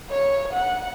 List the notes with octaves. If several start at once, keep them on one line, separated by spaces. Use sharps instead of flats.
C#5
F#5